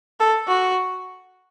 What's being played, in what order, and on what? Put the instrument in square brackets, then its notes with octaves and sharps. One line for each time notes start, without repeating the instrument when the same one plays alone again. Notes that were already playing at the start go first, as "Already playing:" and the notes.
[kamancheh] A4
F#4